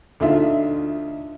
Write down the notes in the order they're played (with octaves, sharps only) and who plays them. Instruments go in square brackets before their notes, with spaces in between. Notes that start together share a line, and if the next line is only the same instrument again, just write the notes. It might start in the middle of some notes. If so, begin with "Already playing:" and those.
[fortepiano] D2 D#4 F4 E5